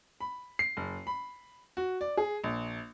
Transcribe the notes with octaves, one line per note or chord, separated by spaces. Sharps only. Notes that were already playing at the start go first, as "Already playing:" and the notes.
B5
C7
F#1
B5
F#4
D5
G#4
A#1